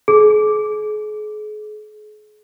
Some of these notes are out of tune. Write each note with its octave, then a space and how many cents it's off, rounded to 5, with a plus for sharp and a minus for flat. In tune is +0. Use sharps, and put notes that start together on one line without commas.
G#4 +40